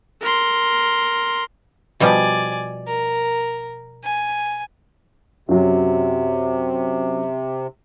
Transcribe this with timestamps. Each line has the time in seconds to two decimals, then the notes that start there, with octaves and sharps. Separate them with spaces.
0.21 A#4 C6
2.00 B2 F3 G3 D5 G#5
2.88 A#4
4.04 G#5
5.49 F#2 C3 F#3